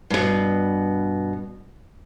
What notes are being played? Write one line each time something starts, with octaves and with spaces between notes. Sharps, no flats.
G2 B2